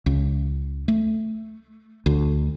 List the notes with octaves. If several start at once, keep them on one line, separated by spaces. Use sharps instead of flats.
C#2
A3
D2